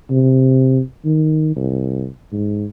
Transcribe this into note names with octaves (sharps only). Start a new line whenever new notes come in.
C3
D#3
C2
G#2